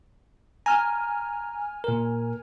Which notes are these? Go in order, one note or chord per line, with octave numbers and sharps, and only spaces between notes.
G#5 A#5 F6
A#2 A#4